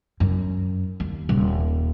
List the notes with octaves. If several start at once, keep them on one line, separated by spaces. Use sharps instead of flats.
F#2
D#2
D#1